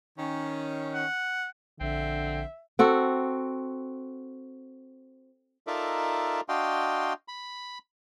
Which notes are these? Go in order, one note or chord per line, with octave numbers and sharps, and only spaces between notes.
D#3 C#4
F#5
A#1 D3 C4 E5
C4 F#4 A4
D#4 F4 A4 A#4 D5 E5
D4 F#4 D#5 F5 G5 C6
B5